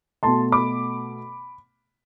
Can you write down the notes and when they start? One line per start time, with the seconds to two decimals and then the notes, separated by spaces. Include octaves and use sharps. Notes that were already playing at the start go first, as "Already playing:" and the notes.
0.23 B2 A3 A5 C6
0.52 B5 D6